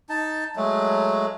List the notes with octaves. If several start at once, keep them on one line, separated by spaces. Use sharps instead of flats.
D#4 A5
F#3 G#3 A3